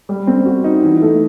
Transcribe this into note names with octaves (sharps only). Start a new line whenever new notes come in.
G3
C4
F#4
D#4
E3
A3